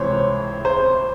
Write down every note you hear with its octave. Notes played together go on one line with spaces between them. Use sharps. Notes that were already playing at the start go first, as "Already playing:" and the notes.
Already playing: C#2 C3 E3 C5 C#5
C5